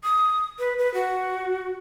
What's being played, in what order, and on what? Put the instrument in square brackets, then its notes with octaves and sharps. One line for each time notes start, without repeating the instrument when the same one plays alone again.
[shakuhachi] D#6
B4
B4
F#4